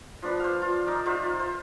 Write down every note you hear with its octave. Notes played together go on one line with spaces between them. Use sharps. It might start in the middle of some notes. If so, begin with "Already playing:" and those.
F3 D4 B4
C5 F5
F4
D#4 A#4 D5
F4 C5 D#5 E5
C5 E5